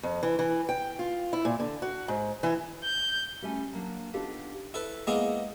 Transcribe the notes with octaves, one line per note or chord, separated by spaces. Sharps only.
F2
E3
E3
G5
F4
E4
A#2
D3
F#4
G#2
E3
G6
G3 A3 C#4 G#5
F#3 A#3 D4
B3 D4 D#4 F4 G4 A4
E4 A4 B4
G#3 A#3 B3 E4 G#4